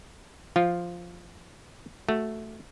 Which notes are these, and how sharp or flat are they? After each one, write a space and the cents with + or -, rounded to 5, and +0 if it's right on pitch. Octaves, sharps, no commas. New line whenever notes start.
F3 +0 F4 +0
A3 +0 F#4 +0